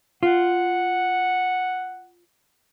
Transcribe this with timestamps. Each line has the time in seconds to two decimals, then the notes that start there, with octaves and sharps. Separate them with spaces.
0.23 F4 F#5